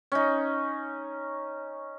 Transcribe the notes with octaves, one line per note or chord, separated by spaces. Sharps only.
C#4 D#4